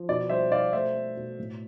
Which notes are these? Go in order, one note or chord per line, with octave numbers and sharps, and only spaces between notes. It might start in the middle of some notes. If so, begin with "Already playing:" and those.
Already playing: F3
B2 D5
G3 C5 E5
B2 D5 F5
A3 C5 E5
A3
B2
A2